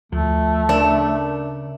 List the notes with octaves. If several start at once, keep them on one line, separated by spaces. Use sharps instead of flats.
D2 F3 A3
C#3 D4 A#4 E5